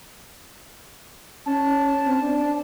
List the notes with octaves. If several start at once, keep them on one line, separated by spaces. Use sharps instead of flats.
C#4 A5
C4
D4